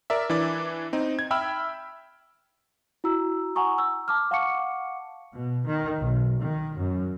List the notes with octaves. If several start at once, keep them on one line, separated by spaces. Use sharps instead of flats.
A#4 D5 E5
E3 D4 E4 D5
C4 D#4
G#6
E5 G5 B5 E6 F6
E4 F#4 A#5 E6
F#5 G#5 A#5 C#6 D#6
E6
A5 D6 F6
F5 F#5 A5 C#6 D6 C#7
B2
D#3
B1
D#3
F#2